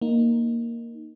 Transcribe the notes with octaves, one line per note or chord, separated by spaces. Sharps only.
A#3 D#4